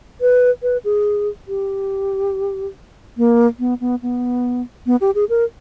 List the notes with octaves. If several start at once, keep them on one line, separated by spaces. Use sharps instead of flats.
B4
B4
G#4
G4
A#3
B3
B3
B3
B3
G4
G#4
A#4